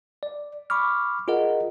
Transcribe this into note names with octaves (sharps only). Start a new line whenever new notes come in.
D5
B5 C#6 D6 F6
F4 G#4 A#4 D#5 F#5